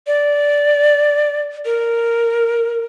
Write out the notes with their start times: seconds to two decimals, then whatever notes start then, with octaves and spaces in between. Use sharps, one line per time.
0.07 D5
1.65 A#4